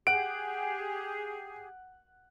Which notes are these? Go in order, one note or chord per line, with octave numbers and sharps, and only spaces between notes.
G4 G#4 F#5 D7